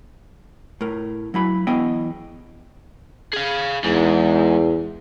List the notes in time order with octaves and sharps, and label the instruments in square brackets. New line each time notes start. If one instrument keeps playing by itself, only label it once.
[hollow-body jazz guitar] A2 A#4
F#3 E4 B5
E2 B3 E4 D#5 G5
[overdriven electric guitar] G#4 F5
[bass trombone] E2 [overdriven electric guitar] G#2